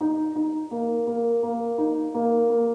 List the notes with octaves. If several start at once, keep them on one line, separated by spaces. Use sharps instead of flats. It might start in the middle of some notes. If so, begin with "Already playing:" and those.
D#4
D#4
A#3
A#3
A#3
D#4
A#3
A#3